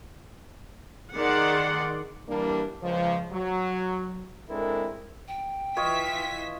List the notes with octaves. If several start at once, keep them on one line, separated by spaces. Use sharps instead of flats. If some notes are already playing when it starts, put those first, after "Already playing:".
D#3 G#4 D5 F#5 C6
E3 G3 A#3 D4
C#2 F3
F#3
G#3 C4 D4 E4 A4 A#4
G5
E3 F4 C#5 D#5 E5 B6